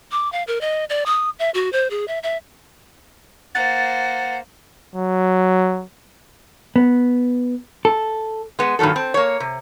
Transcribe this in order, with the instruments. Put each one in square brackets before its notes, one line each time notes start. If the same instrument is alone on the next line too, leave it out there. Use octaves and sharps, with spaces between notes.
[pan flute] D6
F5
A#4
D#5
D5
D#6
E5
F#4
C5
G#4
E5
E5
[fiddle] A#3 C5 [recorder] F#5 [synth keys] A6
[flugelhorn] F#3
[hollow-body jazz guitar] B3
A4
[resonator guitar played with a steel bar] G#3 B3
G2 A#2 D#3 F#3 A4
C4
A#3 C#5
C3